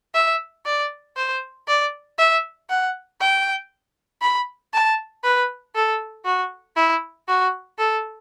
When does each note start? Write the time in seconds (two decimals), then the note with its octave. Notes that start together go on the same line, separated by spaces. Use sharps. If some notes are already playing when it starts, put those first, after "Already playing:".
0.14 E5
0.66 D5
1.17 C5
1.68 D5
2.18 E5
2.69 F#5
3.20 G5
4.22 B5
4.73 A5
5.24 B4
5.75 A4
6.25 F#4
6.76 E4
7.28 F#4
7.78 A4